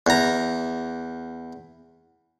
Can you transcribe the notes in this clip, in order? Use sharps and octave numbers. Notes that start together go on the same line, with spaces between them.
E2 A#5